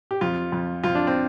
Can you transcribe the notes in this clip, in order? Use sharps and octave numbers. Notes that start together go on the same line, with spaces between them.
G4
F2 F4
F2
F2 F4
D4
C4